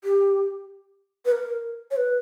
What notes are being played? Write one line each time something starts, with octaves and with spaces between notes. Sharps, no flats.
G4
B4
A#4
C#5
B4